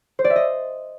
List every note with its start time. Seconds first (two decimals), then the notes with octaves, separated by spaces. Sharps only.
0.19 C5
0.24 D5
0.30 E5
0.36 D#5